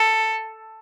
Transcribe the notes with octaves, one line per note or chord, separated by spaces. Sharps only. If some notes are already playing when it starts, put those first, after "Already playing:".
Already playing: A4